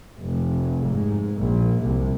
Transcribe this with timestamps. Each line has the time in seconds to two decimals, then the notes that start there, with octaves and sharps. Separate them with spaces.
0.19 F1
0.87 G#2
1.37 A#1
1.83 C2